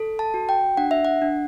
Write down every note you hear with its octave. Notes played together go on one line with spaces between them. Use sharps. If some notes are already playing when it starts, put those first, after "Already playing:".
Already playing: A4
A5
F#4
G5
D4 F#5
E5
F#5
D4